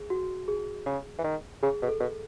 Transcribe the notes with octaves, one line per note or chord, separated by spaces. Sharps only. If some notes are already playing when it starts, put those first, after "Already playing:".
Already playing: G#4
F#4
G#4
C#3
E3
D#3
C#3 G#4
B2
A4
B2